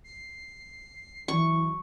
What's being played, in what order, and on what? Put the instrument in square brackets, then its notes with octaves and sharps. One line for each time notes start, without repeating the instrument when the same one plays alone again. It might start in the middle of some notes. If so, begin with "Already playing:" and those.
[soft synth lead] C7
[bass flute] E3 [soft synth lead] F#3 [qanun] C#6